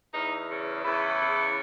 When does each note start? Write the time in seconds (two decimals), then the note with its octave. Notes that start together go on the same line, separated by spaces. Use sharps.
0.14 E2 D#4
0.50 C#3
0.85 E2 E4
1.20 C#3